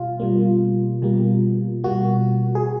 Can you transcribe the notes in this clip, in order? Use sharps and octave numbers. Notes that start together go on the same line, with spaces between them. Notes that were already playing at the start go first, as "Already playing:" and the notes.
Already playing: B2 G3 F4
B2 G3 A#3
B2 G3 A#3
B2 G3 A#3 F#4
G#4